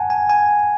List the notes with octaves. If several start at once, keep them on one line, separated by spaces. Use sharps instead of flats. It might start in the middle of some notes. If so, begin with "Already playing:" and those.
Already playing: F#5 G#5 A5
G#5
G#5